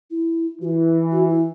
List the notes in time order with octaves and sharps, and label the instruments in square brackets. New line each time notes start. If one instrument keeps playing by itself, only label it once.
[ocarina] E4
[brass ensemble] E3 [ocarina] E4 F#4
[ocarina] F#4
E4